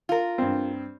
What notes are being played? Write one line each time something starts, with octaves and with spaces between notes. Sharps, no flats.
F4 A#4
G2 C4